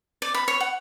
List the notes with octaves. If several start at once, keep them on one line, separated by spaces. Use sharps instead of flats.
D5
B5
C#5
F#5